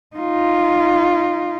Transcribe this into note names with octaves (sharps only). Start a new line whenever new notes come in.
D#4 F4